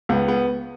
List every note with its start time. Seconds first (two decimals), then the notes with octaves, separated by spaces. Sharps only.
0.09 C#2 B3
0.28 B3